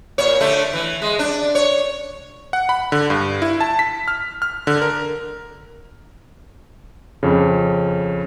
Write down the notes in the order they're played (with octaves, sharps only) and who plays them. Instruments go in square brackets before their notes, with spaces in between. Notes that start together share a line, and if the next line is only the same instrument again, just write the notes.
[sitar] A#2 C#5
D3 A3
E3
G#3
D4
C#5
[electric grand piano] F#5
B5
D3
G2
E4
A5
B6
F6
F6
D3
A#4
F2 C#3